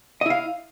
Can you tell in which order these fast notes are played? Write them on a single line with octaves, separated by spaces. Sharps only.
D#5 E4 F5